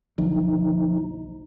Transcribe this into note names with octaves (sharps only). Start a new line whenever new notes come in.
F#1 B1 D3 F3 D#4